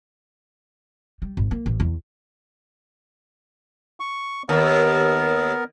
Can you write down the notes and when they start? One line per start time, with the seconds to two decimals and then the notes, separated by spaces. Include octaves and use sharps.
1.22 G3
1.37 G#1
1.51 A#3
1.66 A1
1.80 E2
4.00 C#6
4.49 D#2 B3 A#4